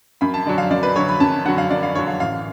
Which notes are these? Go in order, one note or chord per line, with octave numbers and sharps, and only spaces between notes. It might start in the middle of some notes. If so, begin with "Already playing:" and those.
F#2 B5
A5
D3 F#3 D5
F5
F#2 D5
B4
D3 F#3 C#5
B5
F#2 A5
D3 F#3 F#5
F5
F#2 D5
F5
D3 F#3 C#5
F5
A1 F5